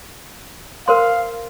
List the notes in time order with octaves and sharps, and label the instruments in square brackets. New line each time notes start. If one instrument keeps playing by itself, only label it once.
[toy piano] A#4 C5 C6 [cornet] F5